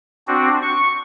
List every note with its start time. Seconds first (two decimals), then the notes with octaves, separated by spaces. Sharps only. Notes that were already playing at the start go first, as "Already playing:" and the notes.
0.27 C4 D4 F#4
0.62 C#6